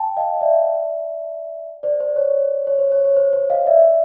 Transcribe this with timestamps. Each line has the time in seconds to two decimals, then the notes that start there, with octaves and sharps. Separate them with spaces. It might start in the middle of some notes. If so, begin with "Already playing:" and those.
Already playing: G5 A5
0.17 D#5 F5
0.41 D5 E5
1.83 C5 D5
2.00 C5 D5
2.16 C#5
2.67 C#5
2.79 C5
2.92 C#5
3.05 C#5
3.17 C5
3.33 C5
3.50 D#5 F5
3.66 D5 E5